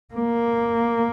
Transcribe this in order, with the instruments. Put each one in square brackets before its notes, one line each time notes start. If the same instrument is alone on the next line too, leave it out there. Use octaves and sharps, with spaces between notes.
[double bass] A#3